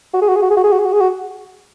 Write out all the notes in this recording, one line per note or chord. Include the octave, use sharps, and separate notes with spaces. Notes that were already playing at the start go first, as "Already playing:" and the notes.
F#4
G#4
F#4
G#4
F#4
G#4
F#4
G#4
F#4
G#4
F#4
G#4
F#4